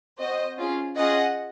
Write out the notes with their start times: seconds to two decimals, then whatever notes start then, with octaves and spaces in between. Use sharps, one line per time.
0.18 C4 F#4 C5 D#5
0.57 C#4 F4 G#4
0.97 C#4 F4 G#4 D#5 F#5